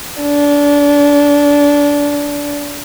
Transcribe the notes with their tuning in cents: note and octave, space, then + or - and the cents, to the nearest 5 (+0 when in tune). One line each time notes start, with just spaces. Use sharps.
D4 -25